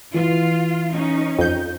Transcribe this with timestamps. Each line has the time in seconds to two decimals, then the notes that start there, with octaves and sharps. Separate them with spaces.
0.14 E3 F4
0.93 C#4 D#4
1.39 F2 G6